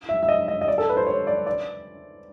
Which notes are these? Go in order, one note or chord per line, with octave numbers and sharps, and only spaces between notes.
E5
E5
D#5
D#5
D#5
D5
A4
B4
C5
C#5
D5
D5